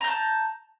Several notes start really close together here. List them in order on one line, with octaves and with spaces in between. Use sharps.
A#5 G6 A5